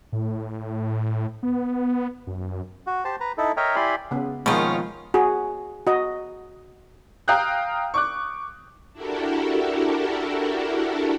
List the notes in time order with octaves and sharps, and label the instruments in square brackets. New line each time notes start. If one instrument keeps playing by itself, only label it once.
[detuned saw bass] A2
B3
F#2
[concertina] F#4
G4 C5 A5
B4 A#5
D#4 E4 A4
A#4 C#5 D#5 E5 G5 A#5
E4 G4 D5 G#5 B5 C6
[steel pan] C#3 B3
[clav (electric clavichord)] B2 D#3 [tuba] F3 [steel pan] G#3 A#3 [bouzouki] C#4 F4
[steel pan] F#4 G#4
F#4 D#5
[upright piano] F5 G5 A#5 D#6 F#6 G6
C#6 D6 F#6
[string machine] D4 E4 F#4 G4 A4 A#4